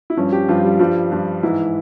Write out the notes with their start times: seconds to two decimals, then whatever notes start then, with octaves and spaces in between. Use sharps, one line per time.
0.10 E4
0.17 G2 F3 C#4
0.32 G4
0.48 G2 F3 F4
0.63 G3
0.79 G2 F3 G3
1.11 G2 F3
1.43 G#2 E3 E4